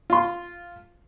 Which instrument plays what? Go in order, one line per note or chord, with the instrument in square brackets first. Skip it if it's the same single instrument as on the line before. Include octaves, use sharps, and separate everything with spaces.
[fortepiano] F4 C6